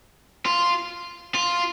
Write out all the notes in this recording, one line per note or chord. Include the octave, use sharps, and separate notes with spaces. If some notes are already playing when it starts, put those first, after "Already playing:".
F4
F4